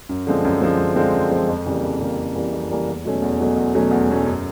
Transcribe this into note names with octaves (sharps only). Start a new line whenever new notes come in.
F#2
D3 F3 G#3 C4
F#2
D3 F3 G#3 C4
F#2
D3 F3 G#3 C4
F#2
D3 F3 G#3 C4
F2
C#3 E3 G3 A#3
F2
C#3 E3 G3 A#3
F2
C#3 E3 G3 A#3
F2
C#3 E3 G3 A#3
E2
B2 F#3 A3 C#4
E2
B2 F#3 A3 C#4
E2
B2 F#3 A3 C#4
E2
B2 F#3 A3 C#4
F#2